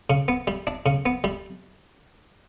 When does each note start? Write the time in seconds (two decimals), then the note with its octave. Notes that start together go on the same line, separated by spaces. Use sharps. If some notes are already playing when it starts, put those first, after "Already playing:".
0.10 C#3
0.28 B3
0.47 G3
0.67 D4
0.86 C#3
1.06 B3
1.24 G3